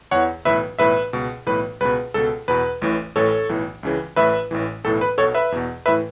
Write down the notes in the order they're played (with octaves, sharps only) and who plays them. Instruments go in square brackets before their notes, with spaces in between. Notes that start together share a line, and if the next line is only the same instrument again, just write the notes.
[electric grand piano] E2 E3 C#5 F#5
B1 A2 E3 B4 E5
B1 A2 E3 B4 E5
C#2 B2
B1 A2 E3 B4
C#2 B2 B4
C#2 B2 A4
E2 B2 B4
A1 A2 E3
A1 A2 E3 A4 C#5
B1 A2 E3
C#2 C#3 E3
A1 A2 E3 B4 E5
A1 A2 E3
B1 A2 E3 A4
B4
B1 B2 A4 C#5
B4 E5
E2 B2
A2 E3 B4 E5